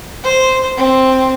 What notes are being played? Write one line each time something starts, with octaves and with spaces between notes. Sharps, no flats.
C5
C4